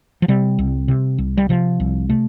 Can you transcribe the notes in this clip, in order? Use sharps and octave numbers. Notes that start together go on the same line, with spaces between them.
F3
C3 G3
C2
C3
C2
G3
C3 F3
C2
C3 A3